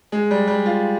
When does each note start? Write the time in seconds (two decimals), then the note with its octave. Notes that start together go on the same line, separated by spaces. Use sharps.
0.12 G#3
0.31 G3
0.48 G3
0.65 F4